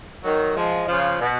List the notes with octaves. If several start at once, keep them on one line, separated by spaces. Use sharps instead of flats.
D#3 F#3
F3 G#3
C#3 F3
B2